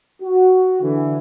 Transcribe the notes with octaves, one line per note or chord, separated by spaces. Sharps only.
F#4
D3 E3